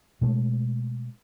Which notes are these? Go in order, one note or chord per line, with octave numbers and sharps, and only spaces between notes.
B2 G#3 A3